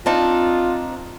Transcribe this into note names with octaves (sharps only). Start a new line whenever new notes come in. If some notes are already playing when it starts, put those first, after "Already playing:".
C4 D4 D#4 F4